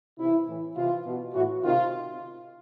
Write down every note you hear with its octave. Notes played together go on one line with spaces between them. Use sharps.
C3 E3 E4
A2 E3
C3 E3 F4
B2
A2 E3 F#4
C3 D#3 F4